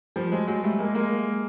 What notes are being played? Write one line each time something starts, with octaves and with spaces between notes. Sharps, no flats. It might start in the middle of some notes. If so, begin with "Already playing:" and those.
F3 G3
F#3 G#3
F#3 G#3
G3 A3
G#3 A#3
G#3 A#3